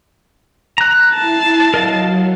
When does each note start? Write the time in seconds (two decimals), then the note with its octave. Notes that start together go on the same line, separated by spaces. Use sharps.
0.78 A#5 F#6
1.14 E4 A5 C7
1.74 F#3 A#4 D#5 F5